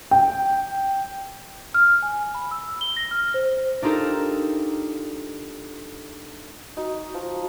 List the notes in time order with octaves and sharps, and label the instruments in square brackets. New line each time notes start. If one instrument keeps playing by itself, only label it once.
[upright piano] G5
[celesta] F6
G#5
B5
E6
G7
A#6
F6
C5
[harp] D4 D#4 F4 G4 A4 A#4
[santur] D#4 [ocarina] F#4
[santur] F3